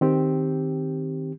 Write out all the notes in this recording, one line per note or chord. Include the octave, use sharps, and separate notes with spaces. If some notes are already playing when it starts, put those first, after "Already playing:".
D#3 C4 G4